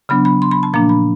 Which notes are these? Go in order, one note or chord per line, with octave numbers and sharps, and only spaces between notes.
C#3 F#3 B3 D4 B5
B5
C6
B5
A5
A#2 F3 A#3 D4 A#5
B5